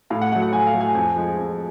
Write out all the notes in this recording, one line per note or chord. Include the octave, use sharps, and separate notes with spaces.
A2 F5
F#5
F#3 A3 F#5
F#5
A2 G#5
F5
F#3 A3
G#5
F2 G#5
F3 G#3
F2